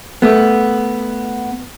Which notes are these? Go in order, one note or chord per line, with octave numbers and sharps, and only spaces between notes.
A3 B3